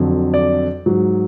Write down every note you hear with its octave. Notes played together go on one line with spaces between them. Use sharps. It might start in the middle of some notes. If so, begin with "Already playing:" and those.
Already playing: F2 D3 F#3
D5
G#2 F#3